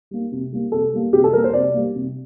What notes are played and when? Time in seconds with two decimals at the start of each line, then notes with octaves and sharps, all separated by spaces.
0.11 G3 A#3
0.32 C3
0.52 G3 A#3
0.72 C3 A4
0.93 G3 A#3
1.13 C3 G4
1.24 A4
1.33 G3 A#3 A#4
1.44 C5
1.53 C3 D5
1.74 G3 A#3
1.95 C3